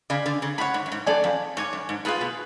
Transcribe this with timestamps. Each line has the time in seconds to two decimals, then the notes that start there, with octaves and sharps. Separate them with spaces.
0.10 C#3 D5 G#5 B5
0.26 D3
0.42 C#3
0.58 A2 C#5 F#5 B5
0.74 G#2
0.86 F#2
0.92 G#2
1.06 F#2 A4 D5 G#5
1.24 F2
1.57 G#2 C#5 G#5 D6
1.73 F#2
1.89 G#2
2.05 A2 F4 G#4 B4
2.21 B2